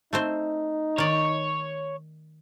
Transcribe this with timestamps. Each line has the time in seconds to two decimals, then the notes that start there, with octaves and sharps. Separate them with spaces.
0.13 A3 C4 D#4 C5
0.98 D#3 C#5 D5